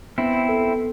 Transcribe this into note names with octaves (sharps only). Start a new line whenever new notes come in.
B3 C4 E4
A4